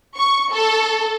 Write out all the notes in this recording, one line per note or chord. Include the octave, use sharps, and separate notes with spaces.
C#6
A4